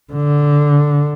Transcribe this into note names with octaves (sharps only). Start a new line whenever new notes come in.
D3